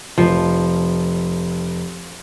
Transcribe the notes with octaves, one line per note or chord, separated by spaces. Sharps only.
F1 F3